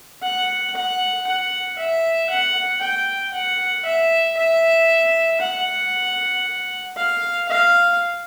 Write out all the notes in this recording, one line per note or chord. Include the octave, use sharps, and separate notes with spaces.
F#5
F#5
F#5
E5
F#5
G5
F#5
E5
E5
F#5
F5
F5